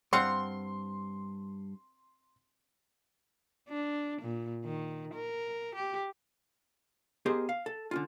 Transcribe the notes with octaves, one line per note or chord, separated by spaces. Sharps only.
G2 C4 F5 F#5 C6
D4
A#2
D#3
A#4
G4
B3 G4 G#4 A#4 C5 D#5
F5
A4
D3 C#4 F4